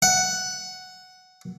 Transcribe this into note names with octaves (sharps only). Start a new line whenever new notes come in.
F#5